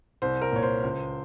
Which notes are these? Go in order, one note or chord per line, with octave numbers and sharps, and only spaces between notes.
C2 C5
A#4
A#2 C#5
C5
C#2